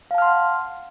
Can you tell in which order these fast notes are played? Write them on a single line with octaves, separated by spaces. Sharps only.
F5 A5 F6 C6 F#5